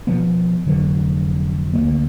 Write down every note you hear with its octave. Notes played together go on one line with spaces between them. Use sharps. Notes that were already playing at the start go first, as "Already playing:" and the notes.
B2 F3 B3
F1 D3 F#3
D2 G#3 A#3